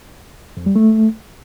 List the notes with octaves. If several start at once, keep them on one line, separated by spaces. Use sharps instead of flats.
F2
G3
A3